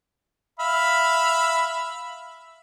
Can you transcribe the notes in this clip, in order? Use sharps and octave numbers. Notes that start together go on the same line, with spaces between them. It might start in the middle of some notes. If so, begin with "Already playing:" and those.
E5 F5 B5